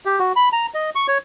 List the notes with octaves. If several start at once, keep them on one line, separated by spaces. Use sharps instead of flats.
G4
F#4
B5
A#5
D#5
C#6
C#5